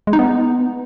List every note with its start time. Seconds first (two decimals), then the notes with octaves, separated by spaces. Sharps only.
0.07 G#3
0.13 D#4
0.19 B3